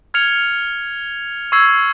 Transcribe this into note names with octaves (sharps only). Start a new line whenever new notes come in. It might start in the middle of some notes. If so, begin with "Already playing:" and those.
F6 G#6 C#7 F7
C#6 E6 G#6 C7